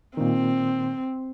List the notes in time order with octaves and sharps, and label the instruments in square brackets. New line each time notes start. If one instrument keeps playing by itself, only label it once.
[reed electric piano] A#2 D#3 [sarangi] C4